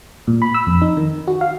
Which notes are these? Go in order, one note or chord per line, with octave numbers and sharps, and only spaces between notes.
A#2
B5
E6
F2
D#4
D#3
F#4
F5